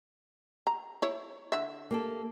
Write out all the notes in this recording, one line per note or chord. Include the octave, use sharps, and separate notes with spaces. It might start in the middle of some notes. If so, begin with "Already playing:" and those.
A#5
E4 C#5
D3 E5
A#3 G4 A4